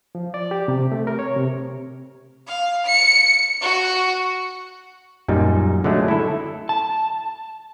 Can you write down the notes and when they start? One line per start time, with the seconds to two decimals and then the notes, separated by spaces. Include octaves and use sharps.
0.15 F3
0.34 D5
0.51 G4
0.68 C3
0.92 A3
1.07 A#4
1.19 C#5
1.37 C3
2.48 F5
2.87 C#7
3.62 F#4
5.28 F#2 A#2 G3 D#4
5.84 D3 F#3 G#3 A3
6.08 E4 A4
6.69 A5